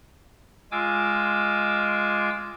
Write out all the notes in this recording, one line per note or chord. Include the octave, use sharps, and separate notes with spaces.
G#3 F4 G#5 D6 E6